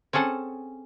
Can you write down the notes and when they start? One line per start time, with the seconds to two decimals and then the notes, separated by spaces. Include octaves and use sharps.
0.13 C4 C#4 G#4 A4 F#5